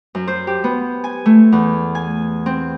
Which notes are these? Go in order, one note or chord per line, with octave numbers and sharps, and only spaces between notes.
F#2
C5
G4
B3
G#5
A3
E2
G#5
C4